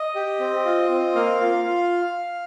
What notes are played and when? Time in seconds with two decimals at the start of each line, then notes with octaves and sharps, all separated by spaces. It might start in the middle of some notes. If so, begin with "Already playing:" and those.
Already playing: D#5
0.15 G4
0.40 C4
0.65 F4
0.91 C4
1.15 A#3 F5
1.41 F4
1.65 F4